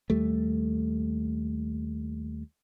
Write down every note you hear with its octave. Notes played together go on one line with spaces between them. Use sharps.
D#2 G3 A3